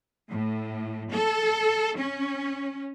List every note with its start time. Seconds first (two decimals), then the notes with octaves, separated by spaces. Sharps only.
0.29 A2
1.12 A4
1.97 C#4